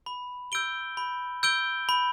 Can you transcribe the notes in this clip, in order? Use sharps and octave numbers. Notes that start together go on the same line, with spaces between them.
B5
E6 G6 D7 G7
B5
E6 G6 D7 G7
B5